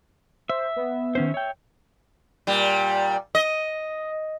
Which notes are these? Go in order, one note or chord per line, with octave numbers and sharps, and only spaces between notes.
C5 E5
B3
D#3 C#4 C5
C#5 G5
A#2 G3
D#5